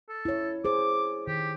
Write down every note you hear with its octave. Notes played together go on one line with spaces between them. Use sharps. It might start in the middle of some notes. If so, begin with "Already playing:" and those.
A4
E4 C#5
G#4 C5 D6
D#3 G4